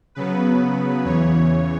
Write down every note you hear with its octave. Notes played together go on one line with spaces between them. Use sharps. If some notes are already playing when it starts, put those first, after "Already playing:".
C#3 F#3 B3 B4
E2 C#3 E3 C#5